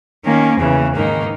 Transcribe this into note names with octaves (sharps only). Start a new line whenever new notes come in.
D#3 A#3 C#4
E2 C#3 E3
G#2 D#3 A#3 D#4